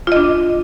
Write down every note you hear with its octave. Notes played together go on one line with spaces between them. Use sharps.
D4 F4 D#5